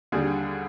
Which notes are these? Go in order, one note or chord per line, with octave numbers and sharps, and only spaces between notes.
D#2 D3 G3 G#4